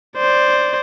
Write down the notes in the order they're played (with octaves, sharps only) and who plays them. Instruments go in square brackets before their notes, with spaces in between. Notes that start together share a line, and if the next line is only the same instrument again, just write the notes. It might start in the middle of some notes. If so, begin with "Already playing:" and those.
[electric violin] C5 D5